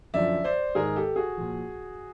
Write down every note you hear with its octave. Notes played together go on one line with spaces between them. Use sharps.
F#2 D3 F3 D5 E5
C5 D5
G#2 D#3 G#4 A#4
G4 A4
F#4 G#4
A#2 F3